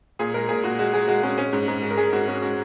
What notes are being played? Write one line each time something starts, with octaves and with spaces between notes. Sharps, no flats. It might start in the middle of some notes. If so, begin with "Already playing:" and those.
A#2 G#4
G#3 A#4
A#2 G#4
A#2 F#4
G#3 F#4
G#3 G#4
G#3 F#4
G#3 C#4
G#3 C#4
G#2
G#2
G#3
A#4
G#3 G#4
G#2 F#4
G#3 C#4
G#3 F#4